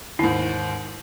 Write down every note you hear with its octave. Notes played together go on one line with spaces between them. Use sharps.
D#2 G#2 E4